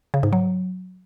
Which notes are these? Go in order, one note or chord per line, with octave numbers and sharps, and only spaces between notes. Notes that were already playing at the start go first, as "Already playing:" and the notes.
C#3
G#2
F#3